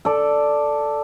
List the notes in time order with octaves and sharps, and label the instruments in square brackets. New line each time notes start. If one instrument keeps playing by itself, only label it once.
[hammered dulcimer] A4 D5